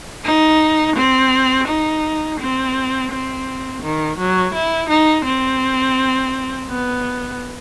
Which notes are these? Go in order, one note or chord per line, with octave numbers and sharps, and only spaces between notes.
D#4
C4
D#4
C4
C4
D#3
F#3
E4
D#4
C4
B3